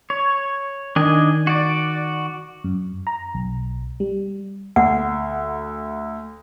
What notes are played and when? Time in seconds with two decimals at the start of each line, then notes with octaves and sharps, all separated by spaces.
0.10 C#5
0.96 D#3 D4 D#5 G#5
1.47 F#4 D5
2.64 F#2
3.07 A#5
3.34 B1
4.00 G3
4.76 D2 F#5